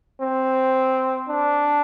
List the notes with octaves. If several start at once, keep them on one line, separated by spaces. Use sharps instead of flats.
C4
D4